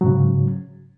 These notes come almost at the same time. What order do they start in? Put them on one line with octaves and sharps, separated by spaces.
F#3 G#2 C#3